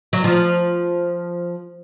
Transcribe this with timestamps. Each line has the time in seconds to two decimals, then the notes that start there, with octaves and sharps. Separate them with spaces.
0.13 F#3
0.24 F3